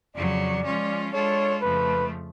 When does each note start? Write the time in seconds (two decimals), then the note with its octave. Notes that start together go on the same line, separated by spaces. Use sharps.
0.15 F2 C#3 F#3 D5
0.65 F3 G#3 C#4 F4
1.13 G#3 D4 F4 A4 C#5
1.62 F2 C#3 F3 A3 B4